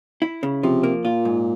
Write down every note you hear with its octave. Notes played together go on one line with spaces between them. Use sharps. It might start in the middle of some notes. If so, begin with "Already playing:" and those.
E4
C#3
C3 F3
A#3
A#2 F4
G#2